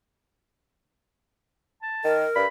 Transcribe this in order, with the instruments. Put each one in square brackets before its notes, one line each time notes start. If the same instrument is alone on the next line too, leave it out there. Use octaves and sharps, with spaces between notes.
[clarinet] A5
[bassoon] D#3 [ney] A#4
[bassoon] G2 [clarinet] B5